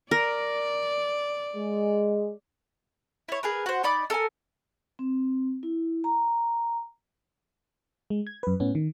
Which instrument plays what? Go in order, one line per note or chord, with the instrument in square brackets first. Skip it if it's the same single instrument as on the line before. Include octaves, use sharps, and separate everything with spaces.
[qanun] A#4 [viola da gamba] D5
[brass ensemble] G#3
[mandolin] E4 C#5
G#4 A#4 B4
F#4 C5
D#4 D5 B5 D6
A4 A#4 G#5
[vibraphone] C4
E4
A#5
[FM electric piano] G#3
G#6
F#2 B4
A2 B3 C#4
D#3